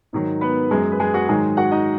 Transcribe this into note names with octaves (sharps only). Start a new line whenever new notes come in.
G#2 D#3 F#3
B3 B4
F#2 F#3 G#3 G#4
B4
G#3 G#4
F#4
G#2 D#3 F#3 G#3 G#4
F#4 F#5
D#4 D#5